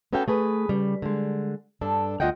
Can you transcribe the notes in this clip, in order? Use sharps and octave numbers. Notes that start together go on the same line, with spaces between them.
B3 C#4 F#4 A4 F5 G5
A3 G#4 B4
C#3 G3
D3 G#3
G2 D4 A4
D2 F4 D#5 F#5 G5